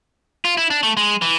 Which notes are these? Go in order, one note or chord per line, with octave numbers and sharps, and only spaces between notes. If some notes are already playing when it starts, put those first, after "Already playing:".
F4
E4
D4
A3
G#3
E3